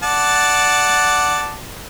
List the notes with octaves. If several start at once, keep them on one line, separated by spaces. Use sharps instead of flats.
D5 F#5 A5